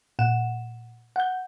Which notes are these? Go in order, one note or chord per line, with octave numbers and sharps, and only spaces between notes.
A#2 F#5 E7
F#5 G6